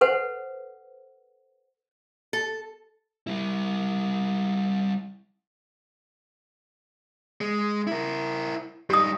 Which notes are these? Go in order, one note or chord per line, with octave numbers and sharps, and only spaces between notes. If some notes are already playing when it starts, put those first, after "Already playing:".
A4 B4 C5 F#5
A4
G3 E4
G#3
E4 A#4
G2 D#4 G4 D#6